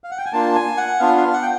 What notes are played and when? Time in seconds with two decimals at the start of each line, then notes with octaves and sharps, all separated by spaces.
0.04 F5
0.11 F#5
0.18 G5
0.25 G#5
0.33 A#3 D4 F4 A5
0.55 G#5
0.77 F#5
1.00 B3 D4 F4 F5
1.17 F5
1.34 F#5
1.42 G5